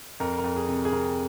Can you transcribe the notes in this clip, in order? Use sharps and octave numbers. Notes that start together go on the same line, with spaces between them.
F2 A#4
A#4
F2
G#4
C3
G#4
C3 A#4